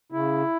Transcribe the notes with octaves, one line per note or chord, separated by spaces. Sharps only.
C#3 E4